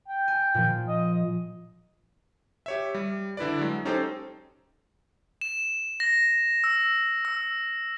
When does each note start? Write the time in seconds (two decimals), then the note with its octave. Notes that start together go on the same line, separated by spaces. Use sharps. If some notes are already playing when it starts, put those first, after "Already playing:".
0.08 G5
0.28 G#5
0.55 A#2 F3
0.88 D#5
2.66 G4 C#5 E5
2.94 G3
3.37 D3 E4 B4 D5
3.59 F#3 G#3
3.85 C#4 D#4 G4 A4 C5 G5
5.41 E7
6.00 A#6
6.64 E6
7.25 E6